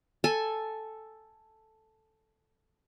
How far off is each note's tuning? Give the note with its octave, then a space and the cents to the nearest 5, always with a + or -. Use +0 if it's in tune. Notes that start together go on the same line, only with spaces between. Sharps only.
A4 +0 G#5 +0